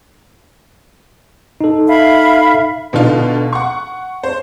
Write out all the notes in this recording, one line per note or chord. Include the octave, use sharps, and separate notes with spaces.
D#4 A4
E5 F5 B5
B2 D3 D#4 F4
F#5 C#6
C5